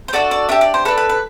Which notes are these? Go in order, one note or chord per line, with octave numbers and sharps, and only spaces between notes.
C5
D4 F#4 A4 D5
D5
D4 G4 E5
D5
C5
D4 A4 B4
B4
B4